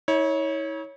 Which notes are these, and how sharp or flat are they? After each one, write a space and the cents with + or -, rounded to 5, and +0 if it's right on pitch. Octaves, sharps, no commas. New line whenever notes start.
E4 -45 C#5 +0